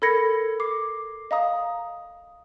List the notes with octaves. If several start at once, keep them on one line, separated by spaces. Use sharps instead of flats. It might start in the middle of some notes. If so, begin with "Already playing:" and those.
A4 A#4 B5 G#6 A#6 C#7
D6 C7
D#5 F5 A#5 D#6